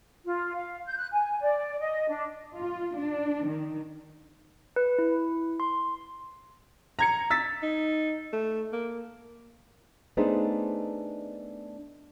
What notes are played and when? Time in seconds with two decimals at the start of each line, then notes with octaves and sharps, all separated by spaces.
0.25 F4
0.54 F5
0.85 G6
0.97 F#6
1.12 G#5
1.40 D5
1.79 D#5
2.08 D4
2.56 F4
2.98 D4
3.47 D#3
4.76 B4
4.99 E4
5.60 C6
6.99 A#5 G#6 C#7
7.30 E6 A6 B6
7.63 D#4
8.33 A3
8.73 A#3
10.17 A3 B3 D4 D#4 G#4 C5